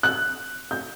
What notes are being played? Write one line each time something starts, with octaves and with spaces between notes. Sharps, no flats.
F#6
G6